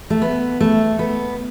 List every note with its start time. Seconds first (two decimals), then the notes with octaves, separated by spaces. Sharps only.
0.10 A3
0.22 B3
0.60 A3
0.99 B3